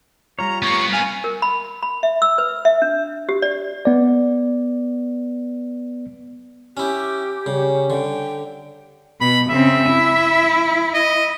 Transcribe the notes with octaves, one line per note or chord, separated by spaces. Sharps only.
G3 F4 C#5 A#5
A#3 B3 C#6
F5 G#5
A#4
B5
B5
E5
E6
B4
E5
D4
G4
D5
B3 D5
C#4 E4 G4
C#3 G3 C#4
D3 G5
B2 B5
C#3 C4 E5
E4
D#5